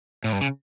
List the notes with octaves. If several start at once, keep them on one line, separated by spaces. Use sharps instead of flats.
A2
G2
C#3